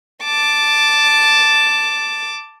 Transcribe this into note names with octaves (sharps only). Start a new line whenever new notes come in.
A5 D6